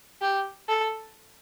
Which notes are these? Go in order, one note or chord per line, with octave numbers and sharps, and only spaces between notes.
G4
A4